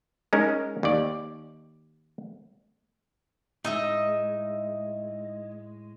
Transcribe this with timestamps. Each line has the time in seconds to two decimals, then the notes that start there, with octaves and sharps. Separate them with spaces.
0.33 G#3 C#4 D#4 A#4
0.83 D#2 D5
3.64 A2 G#3 D#4 D#5 E5